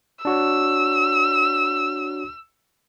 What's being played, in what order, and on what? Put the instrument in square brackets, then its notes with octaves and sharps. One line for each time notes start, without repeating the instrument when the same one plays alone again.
[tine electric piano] D4 F#4 C#5 [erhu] E6